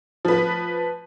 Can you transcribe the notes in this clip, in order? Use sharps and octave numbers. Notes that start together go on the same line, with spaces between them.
F3 B4